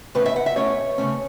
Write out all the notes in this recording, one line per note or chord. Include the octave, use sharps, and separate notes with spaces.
A2 A3 C#4 B4
E5
F#5
E5
A2 A3 C#4 C#5
C#3 A3 C#4